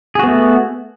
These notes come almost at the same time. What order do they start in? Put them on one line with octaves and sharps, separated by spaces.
G#4 F#4 B3 A3